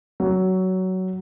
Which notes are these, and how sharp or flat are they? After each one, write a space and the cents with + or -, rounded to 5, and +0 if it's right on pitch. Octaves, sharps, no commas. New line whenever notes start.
F#3 +15